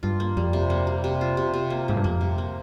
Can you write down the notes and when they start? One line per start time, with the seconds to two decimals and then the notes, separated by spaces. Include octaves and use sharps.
0.03 G2 F4
0.20 A#3
0.37 F2 G3
0.53 C3
0.70 A#3
0.87 G3
1.04 C3
1.21 F4
1.37 C3
1.54 C3
1.70 A#3
1.88 G#2 A#3
1.97 G2
2.04 F2 A#3
2.21 C3
2.38 A#3